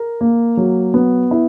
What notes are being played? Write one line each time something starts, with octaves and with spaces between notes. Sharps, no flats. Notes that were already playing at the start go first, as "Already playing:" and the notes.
Already playing: A#4
A#3
F#3
B3
E4